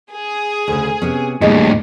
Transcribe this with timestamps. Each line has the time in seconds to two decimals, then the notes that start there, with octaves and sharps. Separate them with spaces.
0.12 G#4
0.68 D2 C#3
1.02 C3 B3 C#4
1.42 D#2 A2 G3 G#4 D#5